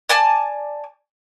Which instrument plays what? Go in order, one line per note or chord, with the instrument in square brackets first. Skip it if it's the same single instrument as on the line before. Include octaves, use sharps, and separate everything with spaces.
[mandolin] D5 G#5 A5